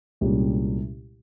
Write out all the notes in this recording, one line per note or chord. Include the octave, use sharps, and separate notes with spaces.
C2 A#2 G#3 C#4 G4